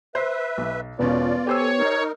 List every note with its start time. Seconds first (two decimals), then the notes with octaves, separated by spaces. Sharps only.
0.15 B4 C5 E5
0.58 B1
0.99 E1 B2 B3 C#4 F4 D5
1.47 G4 A4 C5 C#5 G#5 E6
1.79 D#4 A#4